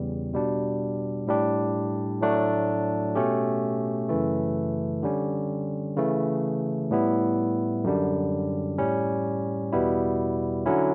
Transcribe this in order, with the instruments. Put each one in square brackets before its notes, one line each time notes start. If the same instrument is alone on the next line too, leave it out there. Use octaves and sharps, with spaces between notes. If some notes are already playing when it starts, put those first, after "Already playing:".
Already playing: [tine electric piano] E2 C#3 G3
B2 G3 D4
A2 G3 D4 G4
A2 F#3 A3 D4 F#4
B2 A3 C#4 G4
F#2 C#3 E3 A3
D3 G3 C#4
C#3 E3 A3
A2 G3 B3 E4
F#2 D3 G3 D4
A2 G3 C#4
E2 B2 G3 B3 E4
D3 F#3 C#4 E4